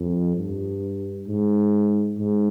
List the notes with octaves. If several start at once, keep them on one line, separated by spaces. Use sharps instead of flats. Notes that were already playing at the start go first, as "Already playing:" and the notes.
Already playing: F2
G2
G#2
G#2